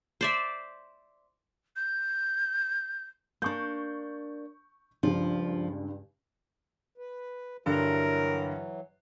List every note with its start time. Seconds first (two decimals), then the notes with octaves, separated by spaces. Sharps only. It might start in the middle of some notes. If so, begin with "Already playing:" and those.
0.21 C5 D5 E5
1.76 G6
3.42 A#3 D4 C#6 G6
5.03 C#2 G2 F3
6.98 B4
7.66 G2 D3 E3 F#3 A#4